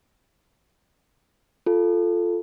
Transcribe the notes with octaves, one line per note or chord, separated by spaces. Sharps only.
F4 A4